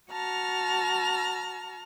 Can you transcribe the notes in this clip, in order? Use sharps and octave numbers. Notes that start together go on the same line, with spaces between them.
F#4 A5 A#5 F6